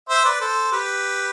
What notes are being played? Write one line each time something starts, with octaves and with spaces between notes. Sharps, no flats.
C5 E5
B4 D5
A4 C5
G4 B4